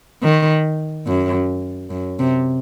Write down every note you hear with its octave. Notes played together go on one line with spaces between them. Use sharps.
D#3
F#2
F#2
C3